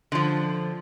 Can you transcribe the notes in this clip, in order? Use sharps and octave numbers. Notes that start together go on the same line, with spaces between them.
D3 F3